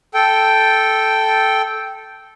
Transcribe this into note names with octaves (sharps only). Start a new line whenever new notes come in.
A4 G5